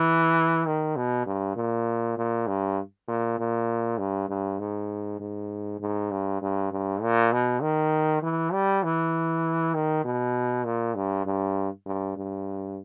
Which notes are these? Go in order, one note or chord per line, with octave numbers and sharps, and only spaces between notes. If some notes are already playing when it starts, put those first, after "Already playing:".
Already playing: E3
D#3
B2
G2
A#2
A#2
G2
A#2
A#2
G2
G2
G#2
G#2
G#2
G2
G2
G2
A#2
B2
D#3
E3
G3
E3
D#3
B2
A#2
G2
G2
G2
G2